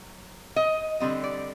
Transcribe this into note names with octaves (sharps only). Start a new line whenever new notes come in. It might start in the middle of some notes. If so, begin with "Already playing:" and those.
Already playing: F#3
D#5
D3 G3 C4 D#5
D5